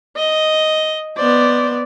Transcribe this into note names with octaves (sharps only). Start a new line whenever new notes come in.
D#5
B3 C5 D5